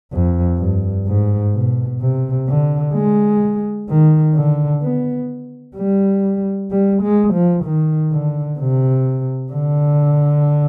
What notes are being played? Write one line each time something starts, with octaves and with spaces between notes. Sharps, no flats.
F2
G2
G#2
B2
C3
D3
G#3
D#3
D3
B3
G3
G3
G#3
F3
D#3
D3
C3
D3